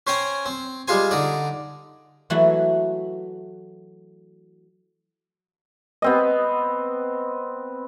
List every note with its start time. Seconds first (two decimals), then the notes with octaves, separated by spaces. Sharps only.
0.07 C#4 C5 G5 G#5 A#5
0.46 C4
0.88 G3 G#3 F4 C5 G#5
1.11 D3 D#4 D5
2.30 E3 F#3 A3 E4 F#4
6.02 B3 C4 D#5